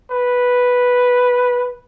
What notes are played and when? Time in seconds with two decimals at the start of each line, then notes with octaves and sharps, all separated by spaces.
0.11 B4